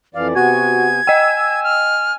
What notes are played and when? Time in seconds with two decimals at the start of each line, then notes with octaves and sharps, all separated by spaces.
0.14 F2 E3 D5 F5
0.35 C3 B3 F#4 G#5 G#6
1.07 D#5 G5 G#5 E6
1.64 F6